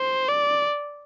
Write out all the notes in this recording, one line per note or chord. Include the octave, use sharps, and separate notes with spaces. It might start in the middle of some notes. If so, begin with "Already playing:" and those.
Already playing: C5
D5